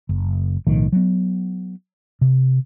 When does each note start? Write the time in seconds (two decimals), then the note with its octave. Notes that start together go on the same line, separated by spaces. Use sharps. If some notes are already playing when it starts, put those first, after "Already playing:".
0.09 F#1
0.67 B1 A2 D#3 F3
0.92 F#3 B3
2.21 C3